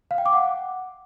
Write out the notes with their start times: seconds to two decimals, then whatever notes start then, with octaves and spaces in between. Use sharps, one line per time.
0.11 F5
0.18 G5
0.26 D6
0.33 F#5